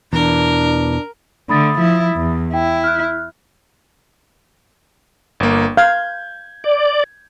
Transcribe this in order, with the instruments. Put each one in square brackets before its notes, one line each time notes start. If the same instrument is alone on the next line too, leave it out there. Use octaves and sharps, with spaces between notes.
[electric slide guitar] E2 B2 E3 [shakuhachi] D4 [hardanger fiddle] A#4
[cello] D3 A3 [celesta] B5 D#6 A6
[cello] F3 E4
E2
[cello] E4 [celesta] G5
[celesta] F6 F#6
[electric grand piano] G1 A#3
[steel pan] F5 [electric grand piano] G6 G#6
[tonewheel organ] D5